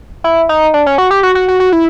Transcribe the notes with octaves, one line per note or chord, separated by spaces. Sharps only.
E4
D#4
D4
C#4
F#4
G4
F#4
F#4
F#4
F#4
E4